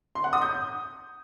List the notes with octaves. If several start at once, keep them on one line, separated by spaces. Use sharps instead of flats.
C6
F#5
D#6
G6